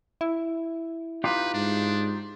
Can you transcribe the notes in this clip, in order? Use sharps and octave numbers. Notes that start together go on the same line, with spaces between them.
E4
D#4 F4 G4 B4
G#2 D4